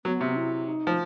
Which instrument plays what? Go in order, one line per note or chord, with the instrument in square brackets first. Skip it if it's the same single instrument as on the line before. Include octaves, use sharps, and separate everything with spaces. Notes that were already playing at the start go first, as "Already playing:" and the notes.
[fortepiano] F#3 [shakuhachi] B3
[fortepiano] C3
[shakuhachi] E4
D#4
[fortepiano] F3